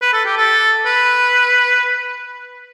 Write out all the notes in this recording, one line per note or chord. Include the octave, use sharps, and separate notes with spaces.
B4
A4
G4
A4
B4